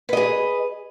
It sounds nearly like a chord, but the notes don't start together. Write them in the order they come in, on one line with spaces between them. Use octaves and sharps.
B4 D#5 G#4